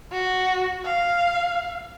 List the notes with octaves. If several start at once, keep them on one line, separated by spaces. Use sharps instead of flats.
F#4
F5